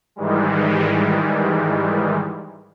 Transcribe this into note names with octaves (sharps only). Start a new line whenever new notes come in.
G#2 D#3 E3 G3 G#3